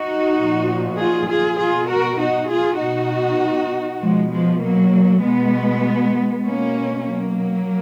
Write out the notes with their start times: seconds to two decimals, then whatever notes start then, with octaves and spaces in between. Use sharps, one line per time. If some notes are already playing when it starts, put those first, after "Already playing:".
Already playing: D#4 F#4
0.37 A#2 F3
0.98 F4 G#4
1.28 F4 G#4
1.58 B2 F4 G#4
1.89 F#4 A#4
2.19 D#4 F#4
2.50 F4 G#4
2.80 B2 D#4 F#4
4.01 B2 F3 G#3
4.32 F3 G#3
4.62 F#3 A#3
5.23 B2 G#3 B3
6.45 B2 A#3 C#4
7.06 F#3 A#3